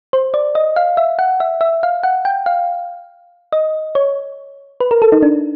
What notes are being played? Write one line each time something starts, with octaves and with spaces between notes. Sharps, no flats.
C5
D5
D#5
F5
E5
F#5
E5
E5
F5
F#5
G5
F5
D#5
C#5
B4
A#4
A4
D#4
D4